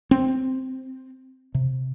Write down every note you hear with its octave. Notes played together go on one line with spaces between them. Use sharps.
C4
C3